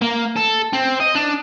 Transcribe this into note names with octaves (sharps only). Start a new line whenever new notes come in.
A#3
A4
C4
D#5
D4